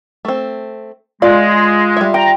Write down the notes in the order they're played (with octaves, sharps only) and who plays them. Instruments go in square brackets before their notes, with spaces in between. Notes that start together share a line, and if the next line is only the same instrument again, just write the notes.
[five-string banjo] A3 C4
[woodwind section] G#3 [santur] F4 [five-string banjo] D5
[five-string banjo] G3 E5
[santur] G5 [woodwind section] A#5